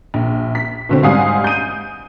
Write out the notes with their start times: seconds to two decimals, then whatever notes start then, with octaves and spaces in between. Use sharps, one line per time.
0.14 A#1
0.55 B6
0.89 B2 D3 C4
1.03 G#2 G3 F5 F#5 G#5 D#6
1.44 G6 D#7